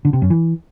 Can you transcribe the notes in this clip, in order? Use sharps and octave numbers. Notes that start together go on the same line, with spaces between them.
D3
C3
F#2
E3